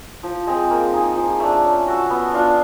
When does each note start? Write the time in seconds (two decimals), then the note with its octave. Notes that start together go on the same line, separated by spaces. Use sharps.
0.23 F3
0.47 G#3 C4
0.70 A#3
0.93 D#4 G#4
1.16 F3
1.40 A3 D4
1.64 C#4
1.87 F#4 A4
2.10 B3
2.34 D4 F4